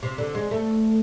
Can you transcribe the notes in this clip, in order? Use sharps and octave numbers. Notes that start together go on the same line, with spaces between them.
C3
D3
G#3
A3